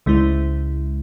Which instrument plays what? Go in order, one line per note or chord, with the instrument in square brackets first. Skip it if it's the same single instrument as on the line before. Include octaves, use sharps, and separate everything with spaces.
[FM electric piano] C#2 C#3 G#3 E4